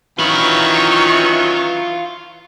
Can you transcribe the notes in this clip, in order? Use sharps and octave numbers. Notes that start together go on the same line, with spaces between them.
D#3 E3 F#3 C#4 F4 B5 C#6